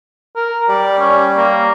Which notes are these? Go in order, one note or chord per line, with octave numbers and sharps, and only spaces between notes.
A#4
G3 D5
C#4
A#3